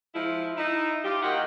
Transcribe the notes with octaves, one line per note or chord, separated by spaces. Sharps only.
F3 G#3 E4
D#4 E4
F4 G4
D#3 A#3 G4 D#5 F5 F#5